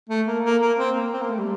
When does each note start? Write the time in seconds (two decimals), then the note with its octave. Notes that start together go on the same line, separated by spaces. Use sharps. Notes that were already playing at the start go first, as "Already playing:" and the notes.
0.09 A3
0.27 A#3
0.44 A#3
0.61 A#3
0.78 C4
0.96 A#3
1.13 C4
1.21 A#3
1.30 A3
1.39 G3